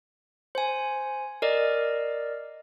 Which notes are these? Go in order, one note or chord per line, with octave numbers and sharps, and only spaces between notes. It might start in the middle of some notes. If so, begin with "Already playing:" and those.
C5 G#5
A#4 D5 D#5